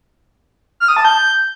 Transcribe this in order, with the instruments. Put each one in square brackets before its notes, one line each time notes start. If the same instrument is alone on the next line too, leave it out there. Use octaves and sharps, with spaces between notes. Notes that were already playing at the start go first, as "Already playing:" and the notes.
[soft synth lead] F6
D#6
A5
G6